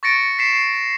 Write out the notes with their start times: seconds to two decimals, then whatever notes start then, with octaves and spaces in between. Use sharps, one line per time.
0.03 C#6 A6 A#6 C#7 D7
0.39 B6 C7 E7
0.52 C7